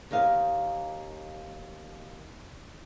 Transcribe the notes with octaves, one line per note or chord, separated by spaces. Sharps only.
D#2 A#4 D#5 F5